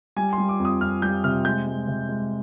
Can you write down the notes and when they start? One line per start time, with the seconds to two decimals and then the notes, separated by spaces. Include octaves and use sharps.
0.16 G3 G#5
0.33 C6
0.38 G3
0.49 D6
0.59 F2
0.65 D#6
0.81 F2 F6
1.02 G3 G6
1.24 C3 F6
1.45 G#3 G6
1.66 G#3
1.88 C3
2.09 G#3